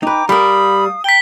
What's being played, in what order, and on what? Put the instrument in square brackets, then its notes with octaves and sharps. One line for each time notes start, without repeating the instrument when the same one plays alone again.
[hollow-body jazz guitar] D#4 B4 [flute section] G5 A#5 D6
[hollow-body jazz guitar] G3 A#4 [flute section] F5 D#6 [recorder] B5
[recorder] G5 [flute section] A#5 [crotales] B6 G7